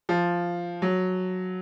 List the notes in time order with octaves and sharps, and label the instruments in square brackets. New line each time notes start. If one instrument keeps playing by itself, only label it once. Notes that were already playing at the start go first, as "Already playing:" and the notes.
[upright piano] F3
F#3